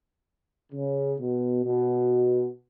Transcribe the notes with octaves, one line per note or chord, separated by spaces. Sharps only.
C#3
B2
B2